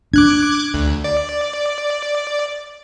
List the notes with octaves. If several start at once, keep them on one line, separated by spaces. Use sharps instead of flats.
D4 D6 F#6 G#6
D2
D5